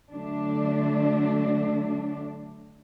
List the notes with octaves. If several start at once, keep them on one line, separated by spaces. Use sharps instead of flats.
D3 F#3 A3 D4